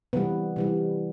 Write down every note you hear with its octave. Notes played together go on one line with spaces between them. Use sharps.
C3 E3 G3 B3
C3 E3 G3